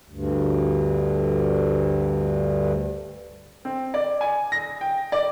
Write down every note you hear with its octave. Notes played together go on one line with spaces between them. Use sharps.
D2 G2
C4
D5
G#5
A#6
G5
D5